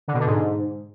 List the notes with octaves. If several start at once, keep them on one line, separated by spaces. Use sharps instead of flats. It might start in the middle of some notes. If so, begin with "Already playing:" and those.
D3
B2
D3
G#2